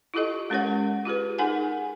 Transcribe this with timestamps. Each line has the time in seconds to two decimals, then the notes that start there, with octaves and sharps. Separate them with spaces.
0.14 E4 F4 G4 A4 D#5
0.50 G#3 C#4 G4 A#4 C#5 F#5
1.05 F4 G4 G#4 B4
1.38 D#4 G#4 A#4 F#5 G#5